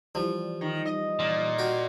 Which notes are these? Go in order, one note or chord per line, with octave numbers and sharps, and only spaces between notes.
E3 F3 G3
D#3
D#5
A#2
F#4 G4